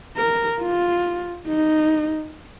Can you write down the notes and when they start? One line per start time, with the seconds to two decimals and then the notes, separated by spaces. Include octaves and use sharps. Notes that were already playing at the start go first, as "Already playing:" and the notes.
0.17 A#4
0.61 F4
1.47 D#4